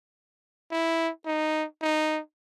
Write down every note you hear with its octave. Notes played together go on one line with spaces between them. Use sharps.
E4
D#4
D#4